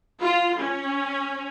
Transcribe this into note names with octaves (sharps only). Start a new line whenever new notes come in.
F4
C#4